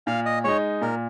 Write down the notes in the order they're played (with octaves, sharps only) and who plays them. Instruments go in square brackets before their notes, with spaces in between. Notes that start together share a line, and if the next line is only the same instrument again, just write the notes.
[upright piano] A#2 [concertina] F5
[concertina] D#5
[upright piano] G#3 D#4 [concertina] C#5
[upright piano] A#2 [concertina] A#4